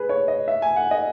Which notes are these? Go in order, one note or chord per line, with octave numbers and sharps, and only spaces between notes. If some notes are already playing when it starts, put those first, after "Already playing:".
Already playing: G#4 B4
C#5
D#5
E5
G#5
F#5
D#5